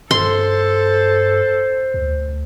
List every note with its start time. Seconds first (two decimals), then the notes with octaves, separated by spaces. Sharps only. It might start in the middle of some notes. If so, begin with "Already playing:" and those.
0.11 G2 A4 C5 C6
1.94 D2